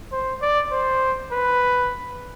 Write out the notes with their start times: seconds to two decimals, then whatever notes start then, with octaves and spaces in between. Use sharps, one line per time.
0.13 C5
0.42 D5
0.72 C5
1.33 B4